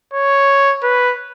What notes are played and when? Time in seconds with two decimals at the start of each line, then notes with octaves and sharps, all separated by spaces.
0.13 C#5
0.83 B4